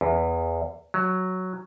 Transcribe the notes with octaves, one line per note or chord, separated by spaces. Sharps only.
E2
F#3